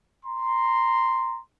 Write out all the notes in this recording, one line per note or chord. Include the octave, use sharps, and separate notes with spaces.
A#5 C6